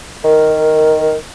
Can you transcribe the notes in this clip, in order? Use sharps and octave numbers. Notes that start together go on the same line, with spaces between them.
D#3 A#4